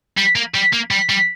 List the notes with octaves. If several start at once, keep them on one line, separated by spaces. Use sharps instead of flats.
G3
A#3
G3
A#3
G3
G3